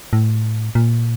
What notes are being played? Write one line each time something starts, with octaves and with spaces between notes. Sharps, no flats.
A2
A#2